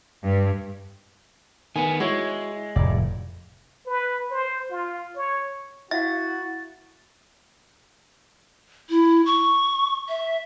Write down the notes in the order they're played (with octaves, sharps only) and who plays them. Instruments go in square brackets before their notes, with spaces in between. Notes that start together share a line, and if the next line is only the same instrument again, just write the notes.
[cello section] G2
[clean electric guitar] D#3 B3 [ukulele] G#5
[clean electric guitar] G#3 [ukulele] E4 F#4 C#5
[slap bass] F1 A2 [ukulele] D5
[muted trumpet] B4
C5
F4
C#5
[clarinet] E4 [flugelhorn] F#4 [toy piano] E5 F5 [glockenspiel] A6
[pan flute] E4
C#6
E5